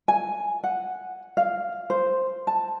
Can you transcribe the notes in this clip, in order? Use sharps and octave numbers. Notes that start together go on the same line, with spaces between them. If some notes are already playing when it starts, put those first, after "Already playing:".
G#5
F#5
F5
C5
A5